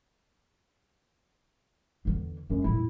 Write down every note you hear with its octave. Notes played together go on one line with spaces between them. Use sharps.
E2 D3
F#2 G#3 A3
F2 A#2 E4